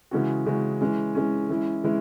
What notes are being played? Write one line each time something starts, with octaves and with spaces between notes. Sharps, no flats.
C#3 E3 G#3 C#4 F#4
C#3 E3 G#3 C#4 F#4
E3 G#3 C#4
E3 G#3 C#4
E3 G#3 C#4 E4
E3 G#3 C#4 E4